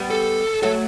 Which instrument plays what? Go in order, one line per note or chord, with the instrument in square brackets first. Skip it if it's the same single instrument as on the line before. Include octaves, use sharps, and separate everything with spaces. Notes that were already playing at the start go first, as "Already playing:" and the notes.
Already playing: [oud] G3 B3
[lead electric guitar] A4
[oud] F#3 A3 [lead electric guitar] A4